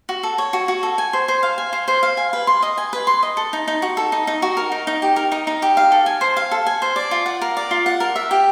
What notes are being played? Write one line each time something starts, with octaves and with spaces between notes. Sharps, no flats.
F#4
A4
C#5
F#4
F#4
A4
G#5
C5
C5
F5
G#5
C5
C5
F5
G#5
B4
C6
D#5
G#5
B4
C6
D#5
A4
D#4
D#4
F#4
A4
D#4
D#4
F#4
A#4
D#4
D#4
G4
A#4
D#4
D#4
G4
F5
A4
G#5
C5
F5
A4
G#5
C5
D5
F4
F#5
A#4
D5
F4
F#5
A#4
E5
G4